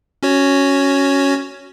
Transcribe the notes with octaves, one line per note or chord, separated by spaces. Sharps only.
C#4 F#4 C#5